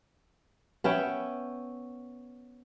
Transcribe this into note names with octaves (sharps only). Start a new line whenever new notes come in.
B3 C#4 E5 G5